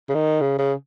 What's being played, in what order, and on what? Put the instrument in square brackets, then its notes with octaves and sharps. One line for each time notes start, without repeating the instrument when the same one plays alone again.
[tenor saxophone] C#3
D#3
C#3
C#3